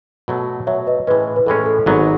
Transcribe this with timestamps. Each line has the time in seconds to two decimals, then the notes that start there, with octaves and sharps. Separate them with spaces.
0.28 B2 F#3 A3
0.67 B2 F#3 A3 C#5 E5
0.87 B4 D#5
1.07 A2 E3 G#3 C#4 B4
1.36 B4
1.46 A2 E3 G#3 C#4 A4
1.66 A4
1.86 G#1 G#2 F#3 B3